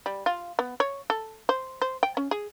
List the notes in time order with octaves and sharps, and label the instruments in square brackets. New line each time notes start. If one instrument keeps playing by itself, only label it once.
[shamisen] G3
F4
B3
C#5
A4
C5
C5
G5
C#4
G#4